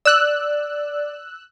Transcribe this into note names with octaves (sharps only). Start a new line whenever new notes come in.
D5 E6 F#6